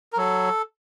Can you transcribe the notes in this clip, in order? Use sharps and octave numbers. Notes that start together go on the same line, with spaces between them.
A#4
F#3 A4